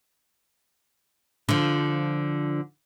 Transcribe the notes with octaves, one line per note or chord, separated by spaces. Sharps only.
D3 F3